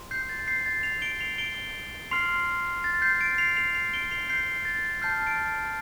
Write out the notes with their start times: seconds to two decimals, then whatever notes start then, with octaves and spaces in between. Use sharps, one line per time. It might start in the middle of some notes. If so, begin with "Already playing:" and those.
Already playing: C6
0.11 G6 C7
0.29 A6
0.47 G6 C7
0.66 A6
0.83 C7 F7
1.02 D7 G7
1.20 C7 F7
1.38 D7 G7
2.11 C6 F6 C7 F7
2.84 A6
3.02 G6 C7
3.20 A6 D7
3.38 C7 F7
3.56 C7 F7
3.75 C7 F7
3.94 D7 G7
4.11 C7 F7
4.30 G6 C7
4.65 A6
5.02 A5 F6 G6 C7
5.26 A6 D7